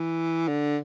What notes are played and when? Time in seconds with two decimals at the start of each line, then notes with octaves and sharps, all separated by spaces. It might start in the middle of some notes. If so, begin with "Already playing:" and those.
Already playing: E3
0.48 D3